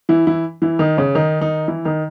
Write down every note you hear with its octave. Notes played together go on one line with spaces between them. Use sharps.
E3 E4
E3 E4
E3 E4
D#3 D#4
C#3 C#4
D#3 D#4
D#3 D#4
E3 E4
D#3 D#4